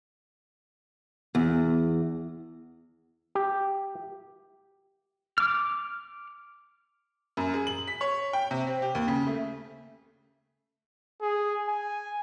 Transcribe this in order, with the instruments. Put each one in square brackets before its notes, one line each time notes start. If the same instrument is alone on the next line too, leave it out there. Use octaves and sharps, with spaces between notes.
[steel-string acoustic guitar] E2
[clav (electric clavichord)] G4
[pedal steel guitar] D6 F6
[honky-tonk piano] F#2
G#4
F#7
B6
C#5
G5
C3
C4
G4
D#2
C#3
A3
[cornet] G#4
G#5